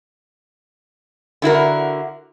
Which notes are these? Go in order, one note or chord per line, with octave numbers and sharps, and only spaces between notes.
D3 E4 F#4 A#4